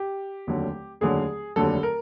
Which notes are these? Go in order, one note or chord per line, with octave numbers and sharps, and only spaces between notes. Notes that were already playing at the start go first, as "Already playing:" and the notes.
Already playing: G4
F1 D#2 D3 F#3
F1 D#2 D3 F#3 G#4
F1 D#2 D3 F#3 A4
A#4